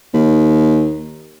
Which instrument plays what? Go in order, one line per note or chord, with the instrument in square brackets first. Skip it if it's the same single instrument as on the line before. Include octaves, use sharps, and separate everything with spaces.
[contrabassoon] D#2